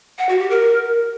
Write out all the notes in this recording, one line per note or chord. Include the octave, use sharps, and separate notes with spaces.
F#5
F#4
G4
A#4